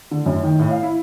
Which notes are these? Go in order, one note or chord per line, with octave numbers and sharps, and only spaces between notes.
D3
F#2
D#3
A2
F5
E4